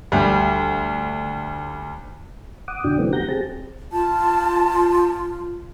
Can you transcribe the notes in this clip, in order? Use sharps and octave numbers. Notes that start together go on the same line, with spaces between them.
D2 G3
F#5 D6 D#6
F2 B2 D3 D4 F#4 G5
C#3 E3 F#3 A3 B3 C4
F#4 G4 F#5 A#5 G6 A#6
C4 G4 G#4 A5
F4 A5